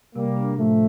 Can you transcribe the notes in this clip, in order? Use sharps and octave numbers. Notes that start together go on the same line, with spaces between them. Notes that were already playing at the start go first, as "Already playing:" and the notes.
C3 G3 A#3
D4
A2 F3 A3